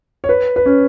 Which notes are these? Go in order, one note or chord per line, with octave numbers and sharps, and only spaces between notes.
C#5
B4
B4
C#4